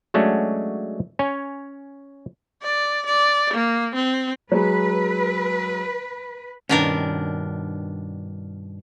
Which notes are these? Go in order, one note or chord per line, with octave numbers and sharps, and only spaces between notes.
F#3 G#3 A3 C#4 D4 F#4
C#4 C#5 G#5
D5
D5
A#3
C4
F#3 G#3 B4
G2 B2 D#3 C#4 D4 A#4